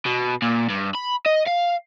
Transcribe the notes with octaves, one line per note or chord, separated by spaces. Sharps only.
B2
A#2
G2
B5
D#5
F5